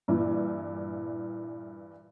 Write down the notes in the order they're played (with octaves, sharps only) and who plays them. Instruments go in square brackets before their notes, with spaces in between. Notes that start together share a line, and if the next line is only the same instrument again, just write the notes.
[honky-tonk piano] G2 A#2 E3